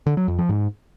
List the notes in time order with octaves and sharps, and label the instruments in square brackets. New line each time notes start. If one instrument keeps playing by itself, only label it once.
[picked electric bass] D3
F#3
F2
F3
G#2